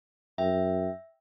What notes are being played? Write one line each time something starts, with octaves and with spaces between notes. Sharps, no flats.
F#2 E5 G5